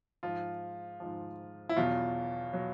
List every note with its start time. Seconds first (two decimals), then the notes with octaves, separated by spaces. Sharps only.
0.23 G#2 F3 F4
1.00 G#2 F3
1.69 E4
1.76 E2 B2 F#3 F4
2.53 B2 F#3